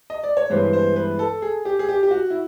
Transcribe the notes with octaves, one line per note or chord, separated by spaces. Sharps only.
D#5
D5
C#5
G2 E3 G#3 B3 C5
C5
B4
A4
G#4
G4
G#4
G4
G4
F#4
E4